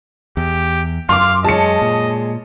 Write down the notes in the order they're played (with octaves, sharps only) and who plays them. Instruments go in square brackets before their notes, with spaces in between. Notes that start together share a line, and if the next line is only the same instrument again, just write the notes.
[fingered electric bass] E2 [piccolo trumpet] G4
[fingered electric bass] F#2 [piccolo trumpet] F5 [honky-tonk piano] C6 D6
[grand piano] G#3 G#4 C#5 [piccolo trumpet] D#5 [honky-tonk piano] A5 C#7
[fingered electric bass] A#2